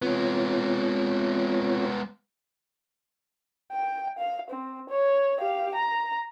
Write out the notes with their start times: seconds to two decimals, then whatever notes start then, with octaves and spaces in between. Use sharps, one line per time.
0.02 G#3 B3 C4 F4 C#5
3.72 G5
4.18 F5
4.50 C4
4.89 C#5
5.40 G4 F5
5.75 A#5